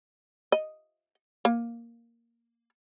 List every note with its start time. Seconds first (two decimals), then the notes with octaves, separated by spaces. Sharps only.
0.52 D#5
1.45 A#3